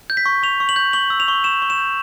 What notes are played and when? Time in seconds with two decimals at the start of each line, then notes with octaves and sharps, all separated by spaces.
0.10 G6
0.17 B6
0.26 C#6
0.43 C#6 F7
0.60 C#6
0.69 F#7
0.76 G6
0.93 C#6 F#7
1.10 E6
1.20 F7
1.28 C#6
1.44 C#6 E7
1.62 C#6
1.70 E7
1.78 G6